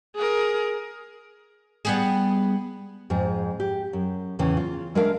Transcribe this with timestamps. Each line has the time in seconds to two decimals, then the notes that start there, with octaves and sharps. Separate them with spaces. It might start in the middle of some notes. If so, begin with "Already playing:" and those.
0.16 G#4 A#4
1.85 G3 B3 G#4
3.10 F2 G#2 G#4
3.60 G4
3.93 F#2
4.39 E2 A2 C#3 E3
4.57 F4
4.95 G#3 D4 A#4 E5 F5